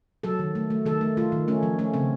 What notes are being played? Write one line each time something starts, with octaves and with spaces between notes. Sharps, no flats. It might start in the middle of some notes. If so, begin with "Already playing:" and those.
F#3 A4
D#3
A3
A3
D#3 A4
A3
A3 F4
D#3
A3 C#4
F3
A3 C#4
C#3 C4